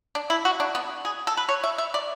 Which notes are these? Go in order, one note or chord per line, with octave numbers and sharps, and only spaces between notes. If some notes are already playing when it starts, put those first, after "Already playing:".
D4
E4
F#4
D4
B3
G#4
A4
B4
C#5
E5
E5
D5